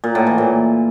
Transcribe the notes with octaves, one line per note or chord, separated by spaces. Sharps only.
A#2
A2
E3
A#2